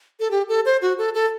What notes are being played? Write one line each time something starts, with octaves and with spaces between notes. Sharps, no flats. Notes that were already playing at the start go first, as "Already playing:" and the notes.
A4
G4
A4
C5
F#4
A4
A4